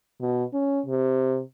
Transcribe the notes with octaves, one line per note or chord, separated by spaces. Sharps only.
B2
C#4
C3